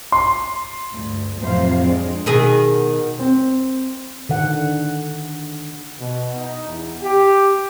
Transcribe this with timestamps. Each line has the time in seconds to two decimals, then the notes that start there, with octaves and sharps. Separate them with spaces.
0.12 C6
0.92 D2 G2
1.39 F2 A2 C3 F#3 C5 F5
1.80 G#3 C4 D4
2.26 B2 D#3 G#4
3.19 C4
4.29 D3 D#3 F#5
5.99 B2
6.36 D#4
6.68 E2
7.03 G4